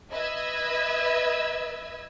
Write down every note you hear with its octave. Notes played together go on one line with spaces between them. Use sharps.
B4 D#5 E5 E6 G#6